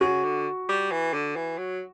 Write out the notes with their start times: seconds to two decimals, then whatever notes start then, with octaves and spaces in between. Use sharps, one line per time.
0.01 C#3 F#4
0.24 D3
0.69 G3
0.91 E3
1.13 D3
1.36 E3
1.58 F#3